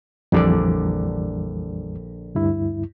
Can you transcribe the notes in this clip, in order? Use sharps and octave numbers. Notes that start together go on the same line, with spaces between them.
A#1 F2 D3 E3 G3 D5
D2 G2 E4